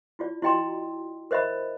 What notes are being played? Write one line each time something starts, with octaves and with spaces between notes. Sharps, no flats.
E4 F4 D5
E4 F#4 D#5 G5 A#5 C6
A#4 C5 D#5 E5 B5